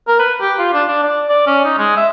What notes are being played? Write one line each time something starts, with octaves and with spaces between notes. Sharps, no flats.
A#4
B4
G4
F4
D4
D4
D5
D5
C#4
D#4
G#3
E5